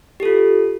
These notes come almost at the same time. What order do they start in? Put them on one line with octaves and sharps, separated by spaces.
G4 A4 F4